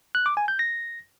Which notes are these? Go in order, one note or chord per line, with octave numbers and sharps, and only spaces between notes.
F#6
D6
G#5
G6
A#6